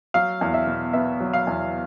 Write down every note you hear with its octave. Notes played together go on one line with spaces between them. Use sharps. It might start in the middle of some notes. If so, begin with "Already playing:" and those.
F#3 F5
E2
E5
B2
B3 E5
F#3
F5
E2